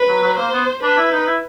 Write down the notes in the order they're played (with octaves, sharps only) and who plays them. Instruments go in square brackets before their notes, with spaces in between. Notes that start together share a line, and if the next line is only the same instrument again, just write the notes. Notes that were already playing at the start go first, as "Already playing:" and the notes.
Already playing: [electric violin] B4
[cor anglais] F#3
F#3
[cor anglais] A#3 [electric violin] C5
[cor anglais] B3
[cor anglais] D4 [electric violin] B4
[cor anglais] E4
D#4
E4